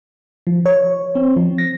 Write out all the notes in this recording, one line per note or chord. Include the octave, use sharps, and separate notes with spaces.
F3
C#5
C4
F3
A#6